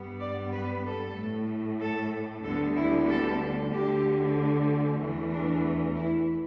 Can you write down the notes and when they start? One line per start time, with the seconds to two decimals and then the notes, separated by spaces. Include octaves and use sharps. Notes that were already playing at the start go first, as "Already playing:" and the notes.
Already playing: G2 G3 B3
0.20 D5
0.52 B4
0.84 A4
1.16 A2 A3
1.80 A4
2.44 D2 D3 G3 B3 A4
2.76 E4
3.08 A4
3.72 D2 D3 A3 G4
4.99 E2 E3 A3
5.32 D4
5.96 E4